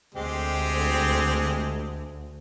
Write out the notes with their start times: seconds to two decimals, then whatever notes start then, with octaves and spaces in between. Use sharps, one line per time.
0.15 D2 G#3 C4 G4